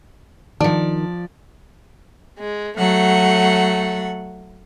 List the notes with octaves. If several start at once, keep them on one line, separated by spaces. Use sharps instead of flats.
D#3 F3 D4 D5
G#3
F#3 A3 F#5